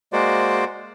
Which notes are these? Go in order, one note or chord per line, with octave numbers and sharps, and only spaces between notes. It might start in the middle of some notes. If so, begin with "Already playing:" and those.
G#3 A#3 F#4 C5 D5